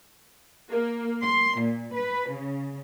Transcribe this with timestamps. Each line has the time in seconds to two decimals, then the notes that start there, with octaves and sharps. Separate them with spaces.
0.71 A#3
1.22 C6
1.61 A#2
1.95 B4
2.31 C#3